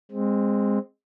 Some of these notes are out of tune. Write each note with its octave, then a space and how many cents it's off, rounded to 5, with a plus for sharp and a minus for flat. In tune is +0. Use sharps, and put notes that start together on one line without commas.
G#3 -15 C4 +0